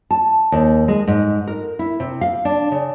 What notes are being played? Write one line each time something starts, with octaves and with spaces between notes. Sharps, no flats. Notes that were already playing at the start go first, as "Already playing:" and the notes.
A5
D#2
G#3
G#2
A#4
E4
C3
F5
D4
C#3